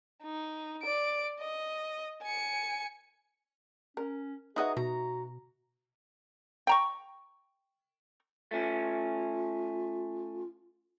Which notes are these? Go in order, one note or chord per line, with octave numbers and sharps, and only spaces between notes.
D#4
D5 D7
D#5
G#5 C#7
C#4 A#4
D#4 F#4 G#4 B4 D#5 E5 A#5
B2 F#4 A#5
G5 A#5 C#6
A3 C#4 F4